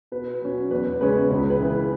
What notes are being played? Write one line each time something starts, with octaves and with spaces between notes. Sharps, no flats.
B2 B4
F#3 C#4
E2 B4
C#3 G#3 C#4 B4
C#2 B4
B4
C#3 E3
B4